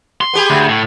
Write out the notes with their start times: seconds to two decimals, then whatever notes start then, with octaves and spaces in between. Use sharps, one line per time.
0.21 C6
0.33 B3 G4 G#4
0.50 D2
0.69 A2